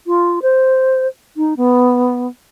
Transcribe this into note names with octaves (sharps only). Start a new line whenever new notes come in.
F4
C5
D#4
B3